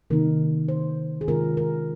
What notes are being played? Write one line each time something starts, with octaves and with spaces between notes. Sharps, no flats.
C3 D#3 A#3 D#4 A#4
C5
G#4
C3 D#3 G#3 C#4 F4 A#4
A#4